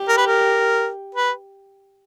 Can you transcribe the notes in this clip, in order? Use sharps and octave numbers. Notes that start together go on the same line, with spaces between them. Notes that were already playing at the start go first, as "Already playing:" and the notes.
Already playing: G4
A#4
B4
A#4
B4